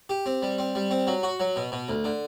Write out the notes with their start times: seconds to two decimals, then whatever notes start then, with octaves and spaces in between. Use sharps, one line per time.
0.09 G4
0.26 C4
0.42 G3
0.58 C4
0.75 G3
0.91 C4
1.07 F#3
1.23 F#4
1.40 F#3
1.56 B2
1.72 B2
1.89 D2
2.05 D3